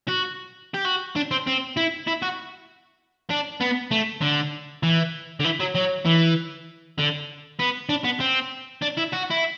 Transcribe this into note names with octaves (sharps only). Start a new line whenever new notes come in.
F#4
G4
F#4
D4
C4
C4
E4
E4
F#4
D4
B3
A3
D3
E3
D3
E3
F#3
F#3
E3
D3
B3
D4
B3
C4
D4
E4
F#4
E4